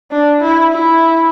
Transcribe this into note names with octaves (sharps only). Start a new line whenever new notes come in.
D4
E4
E4